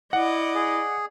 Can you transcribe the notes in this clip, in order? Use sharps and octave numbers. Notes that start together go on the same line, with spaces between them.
E4 D5 D#5 F#5
G#4